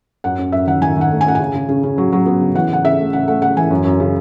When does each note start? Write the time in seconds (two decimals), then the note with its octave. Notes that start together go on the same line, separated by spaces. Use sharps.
0.24 F#2 F#5
0.39 C#4
0.52 F#2 E5
0.67 D#3 F#5
0.81 D#3 G#5
0.96 D#3 F#5
1.11 A3
1.21 G#5
1.26 C#4 F#5
1.35 C#3 G#5
1.54 C#3
1.68 C#3
1.83 C#3
1.98 F#3
2.13 F#3
2.26 B3
2.40 C#3
2.55 E3 F#5
2.69 C#3 F#5
2.84 C#3 E5
2.99 A3
3.13 C#3 F#5
3.28 A3 F#5
3.42 C#3 F#5
3.57 E3 G#5
3.71 F#2
3.85 F#2
4.00 C#3